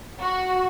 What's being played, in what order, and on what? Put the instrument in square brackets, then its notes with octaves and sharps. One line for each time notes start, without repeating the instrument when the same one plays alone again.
[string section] F#4